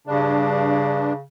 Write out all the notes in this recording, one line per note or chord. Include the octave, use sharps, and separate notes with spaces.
G2 C#3 D4